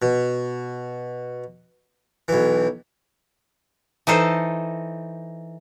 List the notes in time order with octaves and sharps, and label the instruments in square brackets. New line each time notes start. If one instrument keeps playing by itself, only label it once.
[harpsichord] B2
B1 E3
[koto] E3 D#4 A4 C5